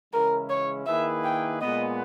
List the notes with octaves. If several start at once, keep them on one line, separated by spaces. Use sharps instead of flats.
C#3 E3 G#3 C#4 E4 A#4
C#5
D#3 A#3 E4 G#4 B4 E5
G5
A#2 G#3 B3 D#5